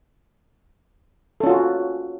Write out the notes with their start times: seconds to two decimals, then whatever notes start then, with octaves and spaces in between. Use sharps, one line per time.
1.40 A4
1.43 C#4
1.46 F4
1.49 F#4